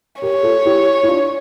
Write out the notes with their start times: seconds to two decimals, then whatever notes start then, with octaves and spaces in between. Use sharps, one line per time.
0.22 G4 A#4 C#5
0.43 F4 A4
0.66 E4 G4
1.03 E4
1.08 D4 F4